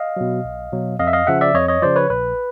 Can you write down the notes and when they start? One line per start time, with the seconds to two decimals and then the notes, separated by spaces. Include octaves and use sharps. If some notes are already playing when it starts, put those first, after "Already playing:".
Already playing: D#5 F5
0.16 B2 F#3
0.45 B1
0.72 B2 F#3
0.99 F2 D#5 F5
1.07 E5
1.13 D#5 F5
1.27 C#3 F3 E5 F#5
1.41 D5 E5
1.55 F2 C#5 D#5
1.68 C#5 D#5
1.82 C#3 F3 C5 D5
1.96 B4 C#5
2.10 A#1 B4